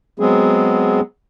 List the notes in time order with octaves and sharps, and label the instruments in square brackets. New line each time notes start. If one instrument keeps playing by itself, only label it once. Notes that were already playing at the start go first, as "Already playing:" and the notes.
[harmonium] F#3 G#3 B3 C4 G#4